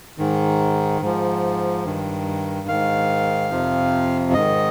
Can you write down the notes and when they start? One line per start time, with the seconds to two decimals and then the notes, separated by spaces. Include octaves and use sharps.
0.18 G#2 D#3
1.02 G#2 F3
1.85 G2 D#3
2.68 G#2 D#3 F5
3.51 F2 C3 F3
4.34 G#2 D#3 D#5